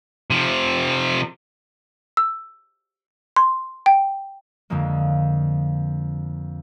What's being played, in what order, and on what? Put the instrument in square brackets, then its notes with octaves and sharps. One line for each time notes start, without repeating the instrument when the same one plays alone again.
[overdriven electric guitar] C3 F3
[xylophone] E6
C6
G5
[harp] F2 D3 F3 G#3 A#3